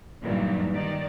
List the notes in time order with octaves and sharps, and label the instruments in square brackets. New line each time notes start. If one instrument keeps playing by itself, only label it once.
[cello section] G2 A#2 D#3 E3 F#3
D#3 D5